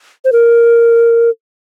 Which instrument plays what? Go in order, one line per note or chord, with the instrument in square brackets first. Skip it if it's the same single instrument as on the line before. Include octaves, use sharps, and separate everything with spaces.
[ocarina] C5
A#4